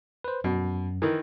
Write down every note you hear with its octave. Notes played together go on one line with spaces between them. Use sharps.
B4 C5
F#2 B2
D#3 E3 A#4